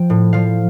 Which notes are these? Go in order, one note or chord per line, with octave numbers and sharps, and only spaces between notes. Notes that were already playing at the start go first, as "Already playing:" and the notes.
Already playing: F3 G5
A2
F3 F5